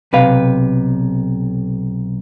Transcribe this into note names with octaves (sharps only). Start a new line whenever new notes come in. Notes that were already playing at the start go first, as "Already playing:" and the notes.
B1 C3 B4 F5